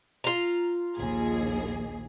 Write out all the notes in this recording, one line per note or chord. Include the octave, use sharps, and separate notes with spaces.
F4 A#5
A#1 D#2 G#4